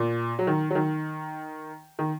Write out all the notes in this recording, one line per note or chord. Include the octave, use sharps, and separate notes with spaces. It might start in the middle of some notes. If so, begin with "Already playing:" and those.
Already playing: A#2
F#3
D#3
F#3
D#3
D#3